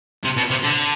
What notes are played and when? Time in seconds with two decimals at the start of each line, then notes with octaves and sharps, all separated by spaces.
0.24 C3
0.37 B2
0.50 C3
0.63 D3